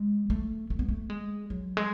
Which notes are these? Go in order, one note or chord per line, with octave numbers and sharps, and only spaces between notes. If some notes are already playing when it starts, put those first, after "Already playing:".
Already playing: G#3
A3
A3
B3
A3
G#3
F#3
G#3